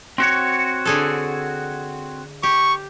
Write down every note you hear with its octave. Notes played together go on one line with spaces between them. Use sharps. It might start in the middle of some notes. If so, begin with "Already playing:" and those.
C4 F#4 C#5
D3 G#4 A4
G4 C#6